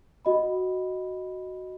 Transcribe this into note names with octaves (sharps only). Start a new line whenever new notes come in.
F#4 D#5 B5